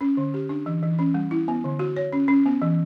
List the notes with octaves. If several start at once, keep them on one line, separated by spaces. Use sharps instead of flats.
C#4
D3
G4
D4
E3
E3
C#4
G3
E4
B3
D3
F#4
C#5
C#4
C#4
B3
E3